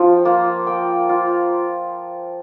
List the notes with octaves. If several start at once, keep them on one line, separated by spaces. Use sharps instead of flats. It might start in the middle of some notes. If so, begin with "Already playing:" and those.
Already playing: F3 F4 G5
A#3 F4
A#3 G5
F4